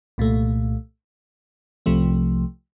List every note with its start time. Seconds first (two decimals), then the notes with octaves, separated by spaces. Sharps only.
0.18 C2 A#2 A3
1.86 C2 C3 F3 A3